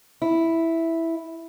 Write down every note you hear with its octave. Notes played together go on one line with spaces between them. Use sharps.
E4